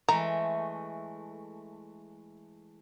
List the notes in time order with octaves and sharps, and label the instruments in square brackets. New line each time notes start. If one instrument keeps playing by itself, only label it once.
[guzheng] E3 G#3 A3 [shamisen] A#5